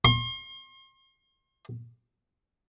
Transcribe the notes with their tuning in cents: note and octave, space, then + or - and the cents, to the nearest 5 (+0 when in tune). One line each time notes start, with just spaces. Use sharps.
C6 +40